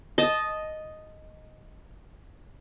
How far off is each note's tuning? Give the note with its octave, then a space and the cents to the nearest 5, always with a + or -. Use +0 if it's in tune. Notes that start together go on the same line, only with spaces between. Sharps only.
D#5 +0 A5 -15